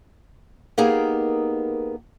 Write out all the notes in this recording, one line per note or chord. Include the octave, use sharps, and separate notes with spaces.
A#3 B3 D#4 G4 G#4 A#4